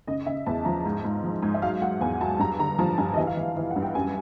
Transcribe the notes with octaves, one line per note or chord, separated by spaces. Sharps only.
C#3 D#5
C#3 E5
E2 A5
F3 A#5
G#2
G#2
F3
G#2
E5
F#3 F5
F#3 F#5
E2 G#5
F#3 A5
G2 A#5
D3 A#5
F3 A5
G2 G#5
D#5
E3 E5
F5
E3
E3
F#5
G2
G5
F#2 G#5